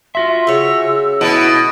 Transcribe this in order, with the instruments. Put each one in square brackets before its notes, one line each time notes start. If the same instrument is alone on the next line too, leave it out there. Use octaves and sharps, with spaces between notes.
[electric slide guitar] F4 F#4 E5 [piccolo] C6
[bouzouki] C#3 C#5 [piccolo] E6
[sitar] B2 [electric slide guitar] E4 [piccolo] D7